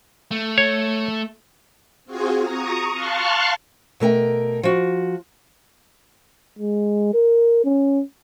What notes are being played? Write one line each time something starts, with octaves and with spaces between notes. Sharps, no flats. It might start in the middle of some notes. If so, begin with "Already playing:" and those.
A3
C#5
C4 F4 F#4 G#4 G#5
A#5 C#6 D#6
F5 A5 C6 C#6 F6 F#6
B2 A3 A#4 G5
F3 F#4
G#3
A#4
C#4